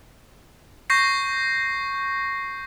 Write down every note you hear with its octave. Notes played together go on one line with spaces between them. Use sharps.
C#6 G6 A#6 C7